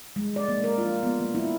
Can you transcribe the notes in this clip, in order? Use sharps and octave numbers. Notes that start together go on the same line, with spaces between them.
G#3
D5
A#3
A#4
F4
B3
A#3
E4